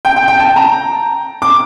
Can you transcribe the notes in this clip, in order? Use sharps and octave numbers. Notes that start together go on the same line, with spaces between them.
G5
G5
G5
A5
A#5
D6